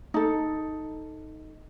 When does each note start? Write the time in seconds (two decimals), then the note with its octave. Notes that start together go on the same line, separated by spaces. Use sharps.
0.14 D#4 A4